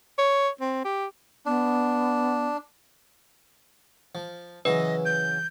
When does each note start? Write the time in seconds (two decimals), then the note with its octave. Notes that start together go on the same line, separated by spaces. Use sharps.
0.18 C#5
0.61 C4
0.84 G4
1.46 B3 D4
4.15 F3
4.65 C#3 E3 F#3 B4 D#5
5.05 G6